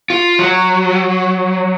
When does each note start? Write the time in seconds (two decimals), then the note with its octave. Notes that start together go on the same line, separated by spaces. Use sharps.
0.10 F4
0.39 F#3